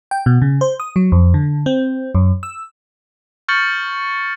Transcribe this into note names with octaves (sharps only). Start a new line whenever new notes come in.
G5
B2
C#3
C5
D#6
F#3
F2
D3
C4
F#2
E6
C#6 F6 G6 A6 C#7 F#7